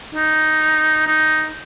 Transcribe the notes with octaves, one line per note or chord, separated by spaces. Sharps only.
D#4
D#4